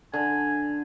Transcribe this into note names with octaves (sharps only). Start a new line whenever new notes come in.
D3 G#5